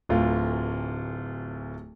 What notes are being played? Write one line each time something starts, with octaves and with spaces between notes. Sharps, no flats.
D1 D2 F4